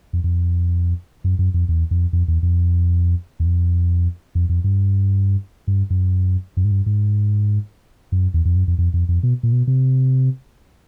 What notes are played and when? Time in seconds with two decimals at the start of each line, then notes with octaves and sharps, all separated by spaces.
0.13 F2
0.24 F2
1.24 F#2
1.39 F#2
1.54 F2
1.69 E2
1.91 F2
2.13 F2
2.28 E2
2.43 F2
3.40 E2
3.46 F2
4.35 F2
4.49 F2
4.64 G2
5.67 G2
5.90 F#2
6.57 F#2
6.65 G#2
6.71 G2
6.86 G#2
8.12 F#2
8.34 E2
8.45 F2
8.56 F#2
8.68 F2
8.78 F2
8.94 F2
9.08 F2
9.23 B2
9.43 A#2
9.52 B2
9.67 C3